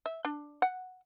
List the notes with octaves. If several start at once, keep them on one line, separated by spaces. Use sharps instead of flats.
E5
D4
F#5